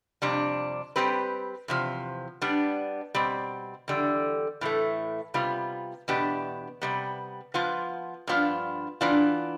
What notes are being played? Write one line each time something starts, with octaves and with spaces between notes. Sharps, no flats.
F2 C3 G3 D4
G3 C4 G4 B4
E2 C3 F3
G3 B3 D4
B2 G3 C4
E2 D3 G3
A2 E3 A3
C3 G3 B3 F4
E2 B2 B3 D4 G4
C3 G3 B3
F3 B3 F4
G2 F3 B3 D4 F4
E3 B3 D4 F4